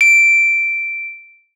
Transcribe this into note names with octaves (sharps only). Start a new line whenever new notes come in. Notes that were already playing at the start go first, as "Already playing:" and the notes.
D7